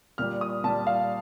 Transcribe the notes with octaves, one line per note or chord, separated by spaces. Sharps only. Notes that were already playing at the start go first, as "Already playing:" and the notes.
A#2 G3 F6
D#6
A#2 G3 A5
F5